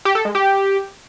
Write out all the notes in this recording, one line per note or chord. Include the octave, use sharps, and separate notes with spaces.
G4
A4
G#3
G4